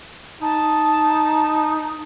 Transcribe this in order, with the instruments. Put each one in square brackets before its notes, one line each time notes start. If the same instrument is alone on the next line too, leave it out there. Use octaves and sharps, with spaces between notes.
[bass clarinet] D#4 [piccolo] A5